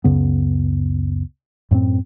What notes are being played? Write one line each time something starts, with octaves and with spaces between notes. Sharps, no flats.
C#2 F#2 C#3 B3
F#2 A2 A#3 C4